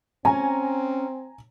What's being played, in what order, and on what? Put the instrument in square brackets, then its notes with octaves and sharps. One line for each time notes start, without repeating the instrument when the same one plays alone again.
[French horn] C4 [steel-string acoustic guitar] C#4 [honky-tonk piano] G#5 A#5